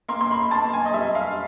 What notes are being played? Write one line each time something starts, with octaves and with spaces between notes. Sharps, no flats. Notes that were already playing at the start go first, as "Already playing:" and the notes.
A#3 C6
C6
B5
A#3 A5
G#5
D#5
G3 E5
F5